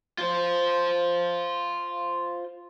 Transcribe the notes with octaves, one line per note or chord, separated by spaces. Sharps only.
F4 C5